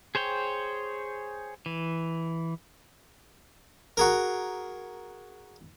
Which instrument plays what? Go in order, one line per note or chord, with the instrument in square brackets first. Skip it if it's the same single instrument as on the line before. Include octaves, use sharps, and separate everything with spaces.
[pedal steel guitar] G#4 C5 C#5 G5
E3
[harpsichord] F#4 G#4 A#4